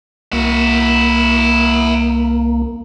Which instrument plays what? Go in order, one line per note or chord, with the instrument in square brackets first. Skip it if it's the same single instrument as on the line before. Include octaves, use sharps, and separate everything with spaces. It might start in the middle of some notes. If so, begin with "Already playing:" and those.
[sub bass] C2 [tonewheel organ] A#3 [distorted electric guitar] E4 F#4